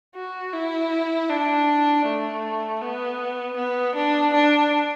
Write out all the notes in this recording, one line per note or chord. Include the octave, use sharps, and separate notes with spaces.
F#4
E4
D4
A3
B3
B3
D4
D4